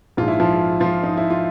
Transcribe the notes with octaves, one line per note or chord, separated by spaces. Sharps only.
A#1 G#2 F3 F4
E4
F3 F4
F3 F4
D#4
E4
F4